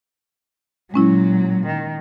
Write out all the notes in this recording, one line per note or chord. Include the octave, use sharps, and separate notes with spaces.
A#2 F#3 G#3 C#4 E4
D#3